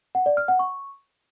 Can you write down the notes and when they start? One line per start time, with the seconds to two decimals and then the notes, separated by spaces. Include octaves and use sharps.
0.15 F#5
0.26 D5
0.37 F6
0.48 F#5
0.59 C#6